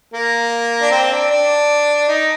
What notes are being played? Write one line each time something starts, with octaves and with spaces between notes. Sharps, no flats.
A#3
D4
C4
D4
D4
D#4